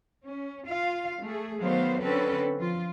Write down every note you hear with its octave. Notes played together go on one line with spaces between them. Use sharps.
C#4
F4 F5
A3 G#4
D#3 F#3 A3 B3 C5 F5
D3 C4 C#4 A4 B4
F3 F4